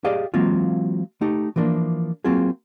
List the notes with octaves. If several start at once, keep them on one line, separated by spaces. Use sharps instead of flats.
G4 G#4 D5 D#5 F5 G5
E3 F#3 G#3 A#3 C4 F4
A3 D#4 G4
E3 F3 A#3 D4
F#3 A#3 C4 F4 G#4